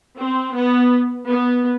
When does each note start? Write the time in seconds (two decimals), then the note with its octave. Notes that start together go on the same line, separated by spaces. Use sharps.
0.20 C4
0.56 B3
1.29 B3